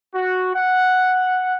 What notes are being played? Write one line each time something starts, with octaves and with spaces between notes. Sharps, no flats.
F#4
F#5